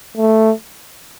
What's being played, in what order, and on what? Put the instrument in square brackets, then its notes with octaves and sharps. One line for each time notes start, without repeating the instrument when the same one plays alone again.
[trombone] A3